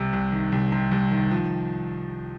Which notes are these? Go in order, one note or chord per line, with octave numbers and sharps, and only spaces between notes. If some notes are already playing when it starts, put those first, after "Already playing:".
Already playing: C2 C3
C2
D#3
C2
C3
C2
D#3
F3